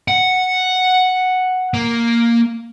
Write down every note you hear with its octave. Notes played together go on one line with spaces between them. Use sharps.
F#5
A#3